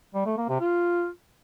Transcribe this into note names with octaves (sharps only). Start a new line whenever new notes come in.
G3
A3
A#3
C3
F4